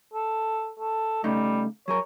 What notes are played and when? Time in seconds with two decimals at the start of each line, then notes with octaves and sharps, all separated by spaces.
0.13 A4
0.80 A4
1.24 C#3 G3 A3 D#4
1.88 F#3 G#4 A#4 C#5